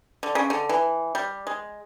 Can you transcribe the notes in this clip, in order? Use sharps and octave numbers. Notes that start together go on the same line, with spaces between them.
D3
C#3
D3
E3
G3
G#3